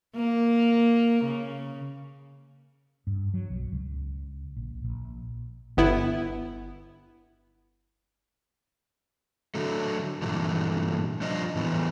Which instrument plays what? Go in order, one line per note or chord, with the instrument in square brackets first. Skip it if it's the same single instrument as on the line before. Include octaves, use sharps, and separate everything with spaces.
[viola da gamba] A#3
C#3
[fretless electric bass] G2
F#3
B1
C#2
A#1
A#1
[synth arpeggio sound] G1 B3 E4
[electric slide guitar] D3 F#3 A3
G2 A#2 D3 E3
F3 G3 D4 F4 C5 D#5
A2 E3 B3